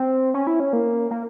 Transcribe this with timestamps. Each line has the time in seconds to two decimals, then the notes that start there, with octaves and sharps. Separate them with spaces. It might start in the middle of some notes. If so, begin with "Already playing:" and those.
Already playing: C4
0.34 C#4
0.47 E4
0.60 C#4
0.73 A#3
1.11 A#3